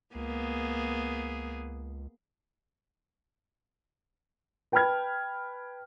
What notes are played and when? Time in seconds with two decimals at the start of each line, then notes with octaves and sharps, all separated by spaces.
0.15 C#2 A#3 B3 G#4
4.72 B4 G5 A5 B5 F6 G#6